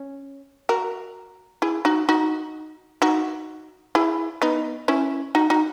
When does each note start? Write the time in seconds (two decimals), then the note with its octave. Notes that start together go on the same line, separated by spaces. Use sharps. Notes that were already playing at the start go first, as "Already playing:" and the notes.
Already playing: C#4
0.69 F#4 A#4
1.62 E4 G#4
1.85 D#4 F#4
2.09 D#4 F#4
3.02 D#4 F#4
3.95 E4 G#4
4.42 B3 D#4
4.88 C#4 E4
5.35 D#4 F#4
5.50 D#4 F#4